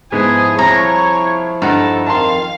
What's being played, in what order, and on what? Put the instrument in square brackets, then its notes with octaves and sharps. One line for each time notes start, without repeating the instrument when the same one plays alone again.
[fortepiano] G#2 B3 [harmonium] F3 E4 [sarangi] G#4
[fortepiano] C2 [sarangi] C#5 [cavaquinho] A#5
[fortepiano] G2 F#5 [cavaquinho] D#4 [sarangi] A4
[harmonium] F2 D#3 [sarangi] F5 [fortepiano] A5 A#5 C6